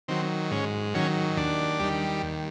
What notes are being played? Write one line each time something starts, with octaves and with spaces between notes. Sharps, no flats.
D#3 F#3 C4
G#2 C#4
D#3 F#3 C#4
D#2 D4
D#3 G3
D#2